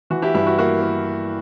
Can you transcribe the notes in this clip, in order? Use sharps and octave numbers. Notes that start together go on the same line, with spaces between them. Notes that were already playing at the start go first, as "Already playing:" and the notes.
E3 F#4
E4 G4
G2 E4
F#4
A#3 F#4
A#3